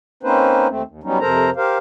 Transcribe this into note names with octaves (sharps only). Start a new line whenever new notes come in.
A#3 C4 C#4 D#4 B4 C5
D#2 A3 C4
D#2
F#3 G3 B3 C#4 D#4
F2 C3 A4 A#4 C5 A#5
G4 A#4 C5 F5